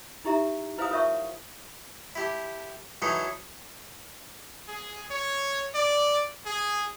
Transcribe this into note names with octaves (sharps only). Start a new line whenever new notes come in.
D#4 E4 G4 E5 A#5
E4 B4 C5 F5 G#5 D#6
F4 A#4 C#5 E5 A5 C#6
E4 G4 A5
E3 F#3 D#4 G#4 A4
G#4
C#5
D5
G#4